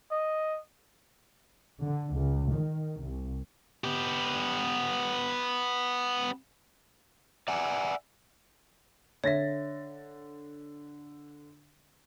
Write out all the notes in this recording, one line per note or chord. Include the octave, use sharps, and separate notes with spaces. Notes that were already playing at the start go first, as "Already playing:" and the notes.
D#5
D3
C#2
D#3
C2
B3 G4
D5 E5 F#5 G#5
D3 C#5 E5 A6 A#6